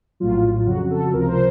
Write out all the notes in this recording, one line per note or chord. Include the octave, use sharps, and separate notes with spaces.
A#1 A2 F#3 F4
F2 C#3 F#3 F#4
A4
C#2 C3 F3 A#4
C5